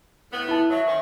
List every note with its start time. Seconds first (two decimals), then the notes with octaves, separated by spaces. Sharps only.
0.32 A2 B3
0.49 E4 A5
0.70 F#3 E5
0.87 D#3 C#4